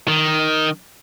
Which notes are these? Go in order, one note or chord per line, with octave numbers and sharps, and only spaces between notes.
D#3